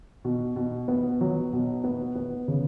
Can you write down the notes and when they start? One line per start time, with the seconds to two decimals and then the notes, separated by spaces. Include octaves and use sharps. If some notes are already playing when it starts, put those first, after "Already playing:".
0.25 B2
0.56 B2
0.88 B3
1.21 F#3
1.53 B2
1.84 B3
2.15 B3
2.48 C#3